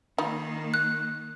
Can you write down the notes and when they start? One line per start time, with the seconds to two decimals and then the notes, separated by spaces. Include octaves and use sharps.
0.18 D#3 A#3 D#4 F4 B5
0.74 F#6